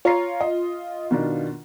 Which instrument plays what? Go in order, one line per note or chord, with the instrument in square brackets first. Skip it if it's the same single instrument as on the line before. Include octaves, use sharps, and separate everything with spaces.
[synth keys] F4 [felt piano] C#5 A#5 C7
[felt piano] D#5
B2 D#3 D4